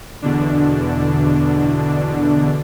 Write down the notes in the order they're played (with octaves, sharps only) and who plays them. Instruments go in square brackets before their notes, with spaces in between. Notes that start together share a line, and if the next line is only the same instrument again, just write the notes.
[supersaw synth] E2 B2 D3 D4